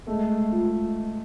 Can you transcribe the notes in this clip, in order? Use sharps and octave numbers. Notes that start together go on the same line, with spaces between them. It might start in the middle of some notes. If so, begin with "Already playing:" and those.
G#3 A3
F4